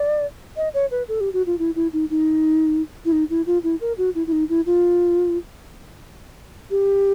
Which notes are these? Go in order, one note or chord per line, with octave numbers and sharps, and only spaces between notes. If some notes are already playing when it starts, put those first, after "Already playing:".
Already playing: D5
D#5
C#5
B4
A4
G4
F#4
F4
E4
E4
D#4
D#4
E4
D#4
E4
F4
E4
A#4
F#4
E4
E4
D#4
E4
F4
G4